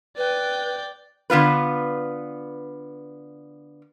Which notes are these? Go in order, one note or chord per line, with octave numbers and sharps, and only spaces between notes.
B4 D5 G5
D3 B3 F4 B4